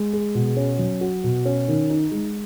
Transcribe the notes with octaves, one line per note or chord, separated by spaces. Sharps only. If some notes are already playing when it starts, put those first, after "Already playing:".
Already playing: G#3
G#4
B2
C#4
F#3
F#4
B2
C#4
D#3
D#4
G#3